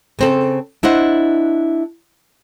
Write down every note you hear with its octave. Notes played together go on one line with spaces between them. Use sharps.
C#3 C4 A4
D4 E4 C5 D#5 F#5